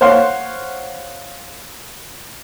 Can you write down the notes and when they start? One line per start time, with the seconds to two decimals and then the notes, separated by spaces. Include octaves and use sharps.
0.01 C5 C#5 F5 F#5 C6